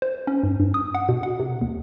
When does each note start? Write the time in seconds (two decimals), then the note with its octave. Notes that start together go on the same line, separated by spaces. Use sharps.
0.02 C5
0.27 C#4
0.43 G2
0.60 G2
0.74 D#6
0.95 F#5
1.09 B2
1.23 F#5
1.40 C3
1.61 D#2